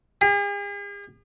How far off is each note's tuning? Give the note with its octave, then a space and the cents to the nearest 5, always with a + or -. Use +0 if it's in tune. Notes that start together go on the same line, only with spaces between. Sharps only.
G#4 -45